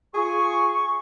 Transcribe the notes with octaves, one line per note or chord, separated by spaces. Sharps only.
F4 G#4 C#6